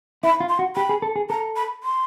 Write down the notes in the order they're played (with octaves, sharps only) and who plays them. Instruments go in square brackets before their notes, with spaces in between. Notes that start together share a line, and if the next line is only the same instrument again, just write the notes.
[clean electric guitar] E4 [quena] B5
[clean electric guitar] F4
[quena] C6
[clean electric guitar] F#4
[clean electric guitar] G4 [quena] B5
[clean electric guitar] G#4
A4
G#4
[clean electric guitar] A4 [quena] A#5
[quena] B5
C6